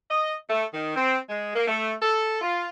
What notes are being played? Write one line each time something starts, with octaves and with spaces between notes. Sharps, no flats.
D#5
A3
D#3
C4
G#3
A#3
A3
A4
F4